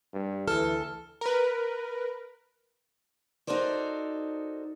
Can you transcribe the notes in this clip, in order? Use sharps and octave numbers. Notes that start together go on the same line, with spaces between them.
G2
D2 E3 A4 F6
A#4 B4
D#4 F#4 A4 A#4 C5 D5